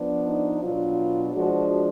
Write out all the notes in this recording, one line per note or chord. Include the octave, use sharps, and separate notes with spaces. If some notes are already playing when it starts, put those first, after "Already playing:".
Already playing: F3 B3 D4
D#4
B2 F#3 D4 F4
F3 G#3 D4 F#4